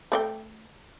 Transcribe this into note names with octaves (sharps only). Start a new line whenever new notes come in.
A3 D5 G5